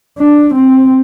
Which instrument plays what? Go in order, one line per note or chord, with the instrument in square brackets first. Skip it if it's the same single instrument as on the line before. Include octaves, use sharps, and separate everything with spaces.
[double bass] D4
C4